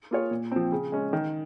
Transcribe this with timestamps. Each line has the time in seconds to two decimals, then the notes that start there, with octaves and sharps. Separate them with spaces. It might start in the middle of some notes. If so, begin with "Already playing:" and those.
0.11 A#3 F4 G#4 C#5
0.31 A#2
0.51 F3 C4
0.72 C#3
0.92 G#3 C#4
1.13 D#3